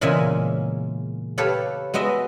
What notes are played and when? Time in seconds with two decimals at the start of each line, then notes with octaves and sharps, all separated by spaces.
0.01 E2 A#2 C#3 G#3 E5 G#5
1.38 G4 A4 B4 C#5 F5
1.94 G#3 B3 F#4 D#5 E5